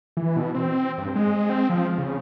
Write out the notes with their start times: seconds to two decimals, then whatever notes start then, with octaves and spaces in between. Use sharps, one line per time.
0.17 E3
0.37 B2
0.54 C4
0.98 G2
1.16 G#3
1.50 C4
1.70 F3
1.98 C#3